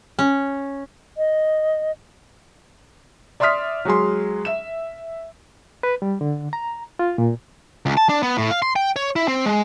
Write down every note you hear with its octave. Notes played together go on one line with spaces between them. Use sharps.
C#4
D#5
D5 E5 C6 D#6 F6 B6
F#3 G#3 G#4 C6
E5 E7
B4
G3
D3
A#5
F4
A#2
C#2
A5
D4
B3
A2
F5
C6
G5
C#5
E4
C4
G#3